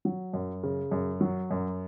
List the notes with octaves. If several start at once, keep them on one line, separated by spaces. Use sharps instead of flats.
F#3
F#2
C#3
F#2
F#3
F#2